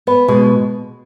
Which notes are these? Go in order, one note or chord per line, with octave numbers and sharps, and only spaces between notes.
B3 B4
B2 G#3